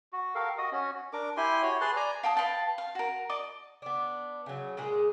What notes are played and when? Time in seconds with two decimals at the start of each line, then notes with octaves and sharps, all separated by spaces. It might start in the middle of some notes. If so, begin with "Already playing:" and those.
0.13 F#4
0.35 G4 A4 A#4 F5
0.58 F#4 D#5 D#6
0.72 C#4 F#4
1.13 D4 A#4 D6
1.37 E4 G4 G#5 C6
1.62 F#4 C#5
1.81 G#4 B4 A5 C6
1.97 D5 G#5 A#5
2.23 F5 G5 A5 D#6
2.37 B4 F5 G5 A5
2.78 F5
2.95 F#4 A#4
3.30 D5 D#5 D6
3.82 B3 D4
4.46 C#3 F#3
4.77 A#2 G#3 G#4